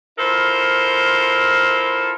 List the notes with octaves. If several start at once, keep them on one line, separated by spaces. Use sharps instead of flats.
E4 F4 A4 A#4 C5